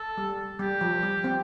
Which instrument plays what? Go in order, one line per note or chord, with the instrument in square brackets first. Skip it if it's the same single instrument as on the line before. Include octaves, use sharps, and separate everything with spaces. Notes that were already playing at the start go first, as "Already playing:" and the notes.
Already playing: [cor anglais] A4
[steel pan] G3
[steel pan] G3 [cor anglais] G4
[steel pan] F3
G3
C4